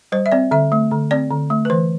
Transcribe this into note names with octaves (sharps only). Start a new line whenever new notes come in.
G3 C5
E5
C4 D5
D3 E5
A3
D3
C4 D5
D3
A3
B4
E3 C5